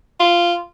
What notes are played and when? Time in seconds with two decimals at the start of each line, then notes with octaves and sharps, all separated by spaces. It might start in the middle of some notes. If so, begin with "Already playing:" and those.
0.20 F4